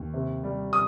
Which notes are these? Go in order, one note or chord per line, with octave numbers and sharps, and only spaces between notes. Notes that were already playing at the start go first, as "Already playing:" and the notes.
Already playing: D#2
C3
G3
D#6